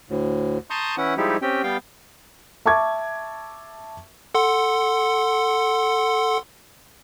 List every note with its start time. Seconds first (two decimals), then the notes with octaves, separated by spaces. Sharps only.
0.10 D2 A2
0.70 A5 A#5 C6 C#6 D#6 G6
0.98 E3 C#4 E4 F#5
1.17 F3 G3 G#3 D#4 E4 G4
1.42 C4 C#4 G4 G5
1.63 G3 B3 F5 G5
2.66 E5 A5 C#6 D6 G#6
4.35 A4 F#5 C6